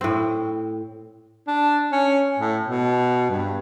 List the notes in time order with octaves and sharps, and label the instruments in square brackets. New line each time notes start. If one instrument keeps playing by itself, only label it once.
[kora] A2 C4
[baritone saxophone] D4
C#4
A2
B2
G2